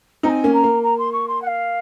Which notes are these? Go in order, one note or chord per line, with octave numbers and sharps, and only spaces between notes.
C4 D#4 G#5 A#5
A#3 C#4
A#5
A#3
A#5
C6
C#6
C6
F#5
F5